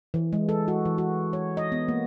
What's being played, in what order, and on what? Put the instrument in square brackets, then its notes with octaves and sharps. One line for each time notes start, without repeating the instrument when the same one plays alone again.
[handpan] E3
G#3
A4
F#4
E3
F#4
C#5
D#5
B3
A#3